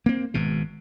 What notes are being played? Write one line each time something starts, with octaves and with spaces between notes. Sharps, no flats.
A#3 C4
G#1 G#2 B2